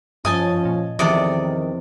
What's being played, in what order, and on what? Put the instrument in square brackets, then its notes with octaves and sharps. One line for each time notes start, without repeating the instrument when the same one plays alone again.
[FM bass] G2 [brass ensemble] F3 C#4 [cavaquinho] D#5 G#5 A5
[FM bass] A#2
[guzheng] E2 C3 D#5 [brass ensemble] D#3 [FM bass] F3 [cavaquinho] A4 D5